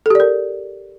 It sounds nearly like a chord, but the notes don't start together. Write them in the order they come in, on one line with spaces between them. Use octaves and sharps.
A4 G4 D5 A#4